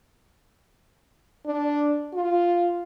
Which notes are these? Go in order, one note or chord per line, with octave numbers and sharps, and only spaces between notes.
D4
F4